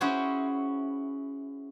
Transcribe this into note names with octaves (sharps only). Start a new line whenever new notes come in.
C#4 E4 F#4 G#4 C5 C#5